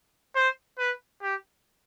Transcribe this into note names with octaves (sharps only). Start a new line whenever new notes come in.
C5
B4
G4